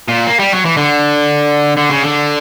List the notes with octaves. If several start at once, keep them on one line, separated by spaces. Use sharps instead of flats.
A#2
A#3
G3
F#3
E3
D3
D3
C#3
D3